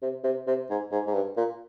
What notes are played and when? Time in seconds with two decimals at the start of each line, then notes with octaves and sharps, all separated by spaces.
0.02 C3
0.24 C3
0.47 C3
0.70 G#2
0.92 G#2
1.07 G#2
1.14 G2
1.37 A#2